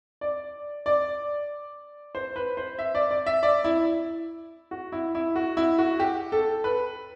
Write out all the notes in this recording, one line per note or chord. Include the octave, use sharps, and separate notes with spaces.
D5
D5
C5
B4
C5
E5
D5
D5
E5
D5
E4
F#4
E4
E4
F#4
E4
F#4
G4
A4
B4